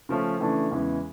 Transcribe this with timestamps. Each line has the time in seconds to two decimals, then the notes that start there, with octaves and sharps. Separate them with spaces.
0.09 C#3 F3 A3 C#4 F4
0.40 C#3 E3 A3 D4
0.71 E2 C#3 E3 G#3